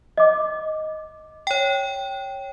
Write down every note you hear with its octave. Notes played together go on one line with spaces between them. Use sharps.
D#5 D6
C#5 G5